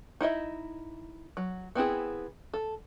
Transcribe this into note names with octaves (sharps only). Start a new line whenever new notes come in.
D#4 E4 D#5 E5
F#3
B3 C4 E4 G#4
A4